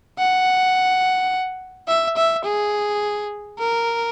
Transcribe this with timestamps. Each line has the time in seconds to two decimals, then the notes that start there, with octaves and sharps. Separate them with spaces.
0.18 F#5
1.88 E5
2.17 E5
2.45 G#4
3.59 A#4